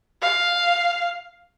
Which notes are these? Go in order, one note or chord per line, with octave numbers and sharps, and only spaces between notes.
F5